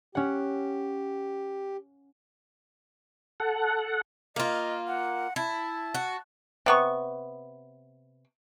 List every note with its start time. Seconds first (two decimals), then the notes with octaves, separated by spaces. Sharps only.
0.15 C#4 G4 F#5
3.40 A4 F#5
4.36 A#3 F4 D#5
4.88 F#5
5.36 E4 A5
5.94 F#4
6.66 C3 B3 C#6